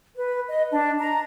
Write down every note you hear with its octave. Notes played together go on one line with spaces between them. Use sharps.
B4
D#5
D4
A#5